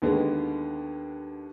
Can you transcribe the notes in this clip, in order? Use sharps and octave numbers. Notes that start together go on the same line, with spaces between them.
D#2 D3 G#3 B3